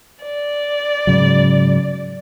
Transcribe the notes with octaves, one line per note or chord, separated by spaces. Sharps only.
D5
G#2 C#3 F#3